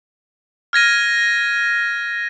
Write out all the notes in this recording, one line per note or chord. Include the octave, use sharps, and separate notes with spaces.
F6 G#6 A#6 D#7